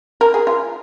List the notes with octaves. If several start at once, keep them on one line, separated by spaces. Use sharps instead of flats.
A#4
G#4
F4